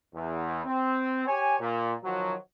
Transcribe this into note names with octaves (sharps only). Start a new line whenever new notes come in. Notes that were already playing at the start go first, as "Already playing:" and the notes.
E2
C4
G4 C#5 G#5
A#2
D#3 F3 F#3